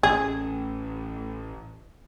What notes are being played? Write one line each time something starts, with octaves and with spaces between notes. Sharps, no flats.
A1 C#4 G#4